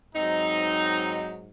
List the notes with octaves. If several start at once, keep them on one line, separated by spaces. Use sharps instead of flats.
G#2 F#3 C4 D#4